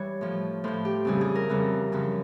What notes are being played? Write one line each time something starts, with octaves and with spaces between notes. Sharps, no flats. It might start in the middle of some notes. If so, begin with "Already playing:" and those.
Already playing: E3 G3 C#5
A2 F3
A2 F3 C5
G4
F2 C#3 E3 G3 G#4
G#4
A#4
F2 C#3 E3 G3
F#2 C#3 F3